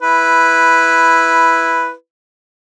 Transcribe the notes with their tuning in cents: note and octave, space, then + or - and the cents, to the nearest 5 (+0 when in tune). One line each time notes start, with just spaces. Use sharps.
E4 +0 B4 +0